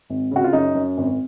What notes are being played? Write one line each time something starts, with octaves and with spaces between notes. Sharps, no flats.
G#1
C#3 F#4
F4
F#2 D#4
F#2
G#1